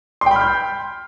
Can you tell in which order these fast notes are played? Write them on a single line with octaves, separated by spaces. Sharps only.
C6 G5 B5 F6 G6